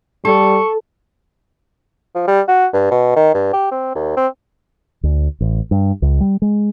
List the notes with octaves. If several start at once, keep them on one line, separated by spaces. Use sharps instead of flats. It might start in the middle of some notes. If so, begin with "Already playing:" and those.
G3 A4 C#6
F3
G3
F#4
G2
B2
D#3
G2
G4
C4
D#2
C4
D2
A1
G2
C#2
G3
G#3